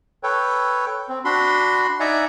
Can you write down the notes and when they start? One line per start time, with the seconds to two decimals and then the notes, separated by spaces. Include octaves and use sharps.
0.23 A4 B4 C#5 G5
1.09 C4
1.25 D4 F#4 B5 C6
2.00 D#4 D5 E5 F#5 G#5 A#5